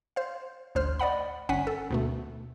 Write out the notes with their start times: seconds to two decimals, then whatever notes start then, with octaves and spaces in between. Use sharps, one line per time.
0.16 C5 F5
0.75 A1 D2 C5 F6
0.99 D5 D#5 F#5 B5
1.49 G1 C#4 F#5 G#5 B6
1.67 A4
1.90 D2 B2 A3